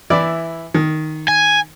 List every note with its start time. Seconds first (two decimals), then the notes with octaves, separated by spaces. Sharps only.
0.10 E3 E4 D5
0.74 D#3
1.28 G#5